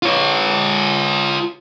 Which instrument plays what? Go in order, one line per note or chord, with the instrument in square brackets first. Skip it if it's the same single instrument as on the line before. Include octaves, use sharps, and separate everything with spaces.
[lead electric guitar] F4 C#5